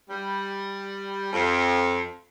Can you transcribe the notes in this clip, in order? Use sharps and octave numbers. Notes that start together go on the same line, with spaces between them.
G3
F2